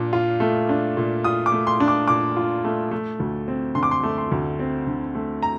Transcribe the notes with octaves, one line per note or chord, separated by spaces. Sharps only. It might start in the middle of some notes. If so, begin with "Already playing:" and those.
Already playing: A#2 D4
F4
A3
D4
A#2
F4 D#6
D6
A3
C6
D4
D6
A#2 D6
F4
A3
A3
D2
C4
D3 C6
D6
C6
A3
C6
D2
C4
D3
A3
A#5